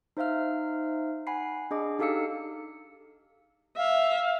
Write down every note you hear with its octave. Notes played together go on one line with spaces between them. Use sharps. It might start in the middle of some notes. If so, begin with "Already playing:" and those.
D#4 C5 E5 F5 F6
F#5 G#5 B5 C7
D4 G#4 D#5 D6
D#4 G4 A4 F5 E6 C#7
E5 F5